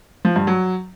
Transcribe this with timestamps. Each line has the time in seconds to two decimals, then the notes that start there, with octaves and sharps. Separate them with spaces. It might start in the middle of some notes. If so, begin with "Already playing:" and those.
0.25 F3
0.36 G2
0.47 F#3